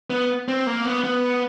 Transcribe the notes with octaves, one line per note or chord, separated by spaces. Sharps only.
B3
C4
A#3
B3
B3